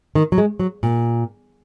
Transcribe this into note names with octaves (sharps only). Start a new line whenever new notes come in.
D#3
F#3
G#3
F#3
A#2